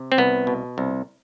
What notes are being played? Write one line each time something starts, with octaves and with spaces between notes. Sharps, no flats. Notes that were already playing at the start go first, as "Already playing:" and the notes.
Already playing: C3
C4
C2 B3
B2
C2